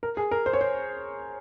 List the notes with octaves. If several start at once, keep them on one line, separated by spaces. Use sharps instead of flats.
A#4
G#4
A#4
C5
C#5
C5